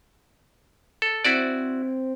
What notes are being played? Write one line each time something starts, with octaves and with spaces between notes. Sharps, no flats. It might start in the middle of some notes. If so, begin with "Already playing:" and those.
A4
C4 E4 F#4 D5